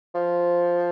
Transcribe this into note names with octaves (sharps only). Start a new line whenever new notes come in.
F3